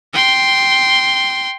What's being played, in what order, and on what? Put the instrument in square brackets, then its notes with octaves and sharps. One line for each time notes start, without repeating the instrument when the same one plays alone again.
[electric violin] G5 C6